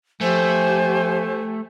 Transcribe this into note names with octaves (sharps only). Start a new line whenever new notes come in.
F3 A3 G4 C5 G#5